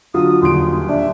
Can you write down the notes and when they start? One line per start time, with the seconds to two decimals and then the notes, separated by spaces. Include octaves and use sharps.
0.14 D3 F#3 F4 D#6
0.42 D#1 E2 D3 C6 D7
0.89 D4 E5